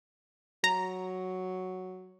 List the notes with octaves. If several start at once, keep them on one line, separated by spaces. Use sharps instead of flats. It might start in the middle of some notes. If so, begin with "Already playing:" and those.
F#3 A#5